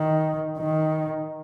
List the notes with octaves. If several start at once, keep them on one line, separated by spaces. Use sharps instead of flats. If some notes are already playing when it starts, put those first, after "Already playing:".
Already playing: D#3
D#3